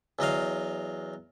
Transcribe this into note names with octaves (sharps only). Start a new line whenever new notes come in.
E2 F#3 D#5 F5